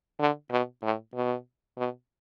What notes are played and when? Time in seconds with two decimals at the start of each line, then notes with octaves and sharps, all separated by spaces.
0.20 D3
0.51 B2
0.83 A2
1.15 B2
1.78 B2